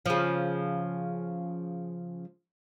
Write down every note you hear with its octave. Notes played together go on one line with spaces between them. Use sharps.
C#3 F3